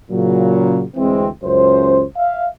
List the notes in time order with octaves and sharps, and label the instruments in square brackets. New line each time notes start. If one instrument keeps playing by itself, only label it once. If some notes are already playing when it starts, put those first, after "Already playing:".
[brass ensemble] A#2 C#3 F#3
D2 E3 G#3 C4
C#2 F#2 C#4 C5
E5 F5